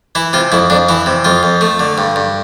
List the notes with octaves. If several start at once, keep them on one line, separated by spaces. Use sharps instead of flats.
E3 E4
C3 F4
F2 E4
F2 D4
E3 E4
C3
F2 F4
F2
A3
D3
G2
G2